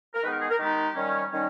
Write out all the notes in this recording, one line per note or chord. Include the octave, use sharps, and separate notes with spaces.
A#4
D#3 G#3 B3 D#4 B4
A#4
G#4
A#4
D#3 G#3 B3 D#4 G4
D#3 G3 C#4
D#3 G3 C#4